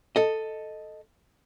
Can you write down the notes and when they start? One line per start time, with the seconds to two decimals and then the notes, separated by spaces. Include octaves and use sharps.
0.16 A4 D#5